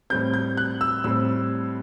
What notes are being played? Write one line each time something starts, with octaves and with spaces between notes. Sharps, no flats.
A2 G3 C4 G6
G6
F#6
E6
A2 G3 C4 E6